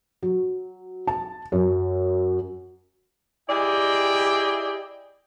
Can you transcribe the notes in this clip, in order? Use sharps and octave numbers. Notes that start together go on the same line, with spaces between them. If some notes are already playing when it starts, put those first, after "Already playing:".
F#3
A5
F#2
E4 G4 G#4 D5 D#5 G5